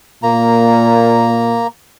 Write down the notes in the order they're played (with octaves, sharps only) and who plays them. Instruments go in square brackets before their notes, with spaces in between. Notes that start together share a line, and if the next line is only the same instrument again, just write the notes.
[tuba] A#2 [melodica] A#3 A#5